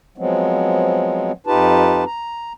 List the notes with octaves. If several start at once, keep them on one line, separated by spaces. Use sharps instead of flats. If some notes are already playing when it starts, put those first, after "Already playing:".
F3 F#3 G#3 B3 C4
F2 D#4 F4 G4 B4 A5
A#5